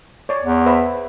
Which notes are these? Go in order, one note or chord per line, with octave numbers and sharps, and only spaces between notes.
C#5 D5
E2
B4 C5 E5